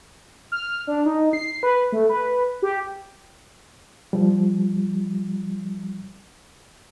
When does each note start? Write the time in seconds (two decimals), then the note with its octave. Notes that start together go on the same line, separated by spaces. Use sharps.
0.52 F6
0.87 D4
1.06 D#4
1.33 C7
1.63 B4
1.92 A3
2.09 B4
2.62 G4
4.13 F3 G3